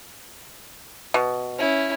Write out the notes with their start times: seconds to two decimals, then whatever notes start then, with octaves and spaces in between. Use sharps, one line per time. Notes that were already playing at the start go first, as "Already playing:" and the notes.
1.14 B2
1.59 C#4 E4